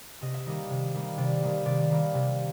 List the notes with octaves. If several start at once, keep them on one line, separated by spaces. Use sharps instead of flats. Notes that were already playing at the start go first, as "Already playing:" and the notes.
C3 D#5
E5
D#3 G3 A#3 D#5
C3
D#3 G3 A#3
C3 D5
D#3 G3 A#3
C3 D5
D#3 G3 A#3
C3